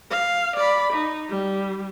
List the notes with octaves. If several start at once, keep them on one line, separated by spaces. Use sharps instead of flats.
F5
D5 B5
D#4
G3